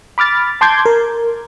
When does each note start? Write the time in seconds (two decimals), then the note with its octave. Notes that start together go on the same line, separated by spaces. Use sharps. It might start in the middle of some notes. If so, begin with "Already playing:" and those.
0.18 B5 D6 F6 A6
0.61 A5 C6 D6 G6 G#6
0.86 A#4